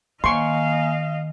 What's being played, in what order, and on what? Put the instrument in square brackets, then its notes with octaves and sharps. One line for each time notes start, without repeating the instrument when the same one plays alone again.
[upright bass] D#3 [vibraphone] A#3 G#5 [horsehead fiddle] D#5 F5 [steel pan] C6 C#6